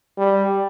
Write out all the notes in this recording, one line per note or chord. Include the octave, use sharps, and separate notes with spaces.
G3